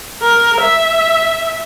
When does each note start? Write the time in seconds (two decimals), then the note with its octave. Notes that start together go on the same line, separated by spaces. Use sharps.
0.22 A#4
0.60 E5